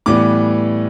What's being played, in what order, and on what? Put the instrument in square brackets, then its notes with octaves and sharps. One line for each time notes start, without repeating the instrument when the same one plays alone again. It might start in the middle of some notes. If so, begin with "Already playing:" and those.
[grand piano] A2 E3 G3 B3 D6